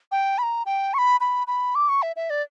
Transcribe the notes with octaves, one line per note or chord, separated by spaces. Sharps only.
G5
B5
A#5
G5
C#6
B5
B5
B5
D6
C#6
E5
E5
D5